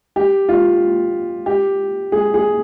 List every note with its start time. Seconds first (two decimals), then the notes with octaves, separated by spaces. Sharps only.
0.16 G4
0.49 F4
1.46 G4
2.12 G#4
2.34 G#4